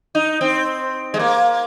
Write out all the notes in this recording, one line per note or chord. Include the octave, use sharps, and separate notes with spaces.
D#4
C4
G#3
A#3